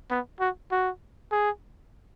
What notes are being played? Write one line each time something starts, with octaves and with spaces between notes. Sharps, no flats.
B3
F#4
F#4
G#4